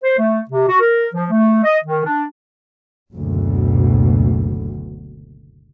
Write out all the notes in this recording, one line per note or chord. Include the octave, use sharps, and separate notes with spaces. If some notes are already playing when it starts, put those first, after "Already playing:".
C5
A3
C3
F#4
A#4
F3
A3
D#5
D#3
D4
F#1 D2 B2